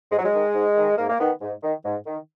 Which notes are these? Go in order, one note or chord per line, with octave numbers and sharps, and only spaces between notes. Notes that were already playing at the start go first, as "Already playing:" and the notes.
G#2 G#3
F#3
G#3
D#3
G#2
D#3
G#2 A#3
A#3
D#3 B3
G#2
D#3
G#2
D#3